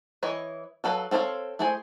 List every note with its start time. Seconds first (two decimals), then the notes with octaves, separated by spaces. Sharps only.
0.23 E3 E4 C#5 D#5
0.84 F#3 A4 B4 F5
1.11 C4 A4 C#5 E5 F5
1.59 A3 E4 G#4 C5 G#5